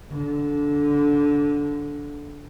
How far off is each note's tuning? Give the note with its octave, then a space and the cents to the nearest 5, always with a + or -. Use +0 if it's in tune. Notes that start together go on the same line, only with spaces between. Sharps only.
D3 -15